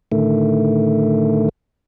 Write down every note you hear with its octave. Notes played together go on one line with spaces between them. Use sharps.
A2 D3 D#3 A3